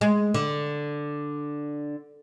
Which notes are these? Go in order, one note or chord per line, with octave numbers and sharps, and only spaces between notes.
G#3
D3